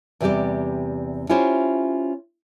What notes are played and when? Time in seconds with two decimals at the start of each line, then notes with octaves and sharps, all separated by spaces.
0.20 E2 C3 G3 G4 D5
1.29 C#4 E4 F4 G4 C5 C#5